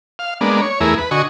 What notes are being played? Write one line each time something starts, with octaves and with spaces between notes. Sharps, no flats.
F5
G#3 A#3 B3 D4
C#5
E2 A3 E4 G#4 A#4
B4
D3 F#4 D#5 G#5 C#6